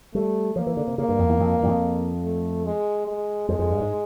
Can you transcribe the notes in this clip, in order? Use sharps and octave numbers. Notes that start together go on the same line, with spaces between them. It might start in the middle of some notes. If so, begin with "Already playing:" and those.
G3 A3
F3 A#3
E3
D3
C3
C#3 A#3
G2
F2
E2
F2
G2
E2
F2
A3
G#3
G#3
F2 G#3
F2
G2
G#2